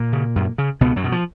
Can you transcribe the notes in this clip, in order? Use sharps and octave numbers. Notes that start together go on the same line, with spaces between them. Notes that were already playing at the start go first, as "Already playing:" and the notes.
Already playing: A#2 A#3
C#3
F#2
C#3
C#2 B2 B3
F#2 F#3
B2
F3